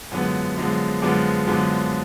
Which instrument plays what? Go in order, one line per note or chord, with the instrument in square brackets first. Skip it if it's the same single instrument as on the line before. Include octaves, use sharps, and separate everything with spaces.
[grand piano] F#2 D3 F3 G#3 B3
F#2 D3 F3 G#3 B3
F#2 D3 F3 G#3 B3 D6
F#2 D3 F3 G#3 B3